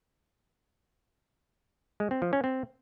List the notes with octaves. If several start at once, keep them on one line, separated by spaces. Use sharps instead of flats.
G#3
C4
F3
C#4
C4